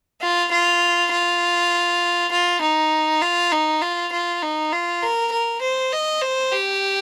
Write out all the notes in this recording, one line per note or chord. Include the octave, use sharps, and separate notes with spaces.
F4
F4
F4
F4
D#4
F4
D#4
F4
F4
D#4
F4
A#4
A#4
C5
D#5
C5
G4